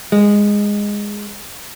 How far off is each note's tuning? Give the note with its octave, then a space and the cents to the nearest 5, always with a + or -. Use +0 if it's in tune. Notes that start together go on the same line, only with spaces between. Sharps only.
G#3 -10